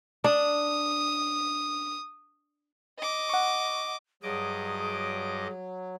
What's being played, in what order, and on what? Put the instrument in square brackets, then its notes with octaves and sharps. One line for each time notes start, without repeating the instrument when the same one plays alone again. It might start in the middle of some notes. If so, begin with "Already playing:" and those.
[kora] D4 [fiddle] D#6
[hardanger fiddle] D#5 D6
[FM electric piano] F#5 C#6
[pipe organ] G2 D#5 D6 [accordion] F#3 [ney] G#4